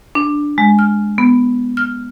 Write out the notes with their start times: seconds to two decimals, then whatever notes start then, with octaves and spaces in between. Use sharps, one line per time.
0.15 D4
0.58 G#3
0.79 F6
1.18 B3
1.77 F6